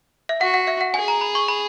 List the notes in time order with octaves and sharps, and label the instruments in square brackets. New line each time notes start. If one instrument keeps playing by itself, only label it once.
[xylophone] E5
[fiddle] F#4 [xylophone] F#5
[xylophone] F#5
E5
F#5
[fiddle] G#4 [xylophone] G#5
[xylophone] A#5
B5
C#6
B5